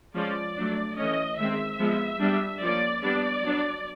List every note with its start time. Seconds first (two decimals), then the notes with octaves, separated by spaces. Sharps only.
0.15 F3 G#3 C#4 D5
0.57 F#3 A3 D4
0.98 E3 A3 C#4 D#5
1.38 D#3 G#3 C4 E5
1.80 F3 G#3 B3
2.20 G3 B3 D4
2.62 F3 A#3 C#4 D5
3.03 G3 B3 D4 D5
3.44 F#3 B3 D4